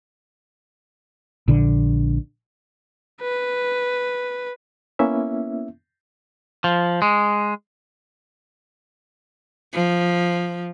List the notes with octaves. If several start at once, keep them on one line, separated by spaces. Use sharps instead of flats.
A#1 D3
B4
A#3 B3 C#4 E4 E5
F3
G#3
F3